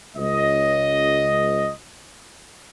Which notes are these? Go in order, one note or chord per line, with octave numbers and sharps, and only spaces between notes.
C#2 D#5